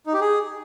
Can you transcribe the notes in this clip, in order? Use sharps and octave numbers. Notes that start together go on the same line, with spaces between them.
D#4
G4
G#4